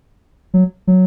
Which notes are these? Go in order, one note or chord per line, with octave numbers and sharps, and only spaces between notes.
F#3
F#3